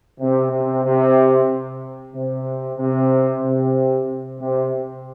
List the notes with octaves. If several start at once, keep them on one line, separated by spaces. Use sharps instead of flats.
C3
C3
C3
C3
C3
C3
C3